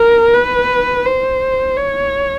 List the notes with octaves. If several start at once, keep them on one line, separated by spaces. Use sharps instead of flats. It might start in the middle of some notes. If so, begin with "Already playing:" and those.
Already playing: A#4
B4
C5
C#5